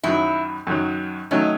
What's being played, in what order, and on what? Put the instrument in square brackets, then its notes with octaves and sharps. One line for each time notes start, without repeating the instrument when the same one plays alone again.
[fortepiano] F#2 D#3 F#3 [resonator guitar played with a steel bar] E4
[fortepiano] F#2 D#3 F#3
[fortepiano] D#3 F#3 A3 C#4 [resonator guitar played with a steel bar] D#4